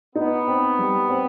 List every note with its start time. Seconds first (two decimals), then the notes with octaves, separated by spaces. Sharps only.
0.15 B3 D#4
0.47 C4
0.79 G3
1.09 C4